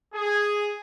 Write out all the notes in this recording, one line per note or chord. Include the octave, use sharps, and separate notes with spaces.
G#4